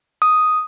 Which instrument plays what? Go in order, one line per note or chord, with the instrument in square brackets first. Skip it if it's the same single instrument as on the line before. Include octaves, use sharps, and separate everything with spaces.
[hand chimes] D#6